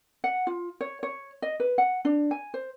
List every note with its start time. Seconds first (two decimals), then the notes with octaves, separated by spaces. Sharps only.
0.24 F#5
0.47 F4
0.81 C#5
1.03 C#5
1.42 D#5
1.60 B4
1.78 F#5
2.05 D4
2.31 G#5
2.54 C5